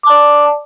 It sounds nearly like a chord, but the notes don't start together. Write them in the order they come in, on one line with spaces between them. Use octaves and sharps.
D6 A5 D5